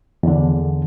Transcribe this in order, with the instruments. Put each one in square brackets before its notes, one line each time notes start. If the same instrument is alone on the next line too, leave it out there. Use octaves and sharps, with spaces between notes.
[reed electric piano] E2 D3